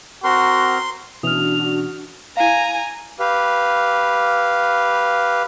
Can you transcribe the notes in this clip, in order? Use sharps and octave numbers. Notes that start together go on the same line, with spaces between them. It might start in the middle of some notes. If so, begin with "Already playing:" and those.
C4 F#4 A#4 C6
B2 E3 C#4 D4 F#4 D#6 F6 F7
E4 F5 G#5 A#5
G4 B4 F5